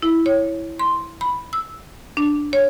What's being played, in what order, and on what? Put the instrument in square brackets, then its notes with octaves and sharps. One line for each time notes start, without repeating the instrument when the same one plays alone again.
[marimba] E4
C#5
C6
B5
E6
D4
C#5